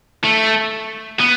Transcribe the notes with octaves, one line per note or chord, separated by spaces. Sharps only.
A3
B3